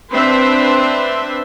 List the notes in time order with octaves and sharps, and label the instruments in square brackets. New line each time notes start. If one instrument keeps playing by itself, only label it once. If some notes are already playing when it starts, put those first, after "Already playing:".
[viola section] C4 D4 B4 C5 E5